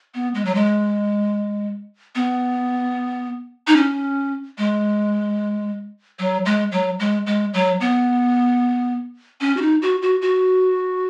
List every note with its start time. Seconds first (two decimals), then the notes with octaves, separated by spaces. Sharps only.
0.15 B3
0.34 G#3
0.45 F#3
0.55 G#3
2.15 B3
3.67 D#4
3.76 C#4
4.58 G#3
6.19 F#3
6.45 G#3
6.72 F#3
7.00 G#3
7.26 G#3
7.54 F#3
7.80 B3
9.41 C#4
9.57 F#4
9.62 D#4
9.82 F#4
10.02 F#4
10.22 F#4